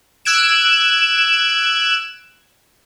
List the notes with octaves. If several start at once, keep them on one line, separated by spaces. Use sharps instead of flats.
E6 F#6 G#6 D7 E7